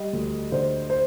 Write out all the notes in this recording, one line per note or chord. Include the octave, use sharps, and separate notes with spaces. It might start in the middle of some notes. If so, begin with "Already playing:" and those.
Already playing: G3 D#5
D2
D3 C5
C5